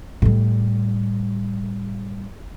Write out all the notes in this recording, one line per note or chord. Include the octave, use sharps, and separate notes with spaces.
A2 G3